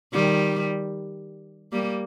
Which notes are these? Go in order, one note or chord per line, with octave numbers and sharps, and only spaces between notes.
D#3 G3
G3 A#3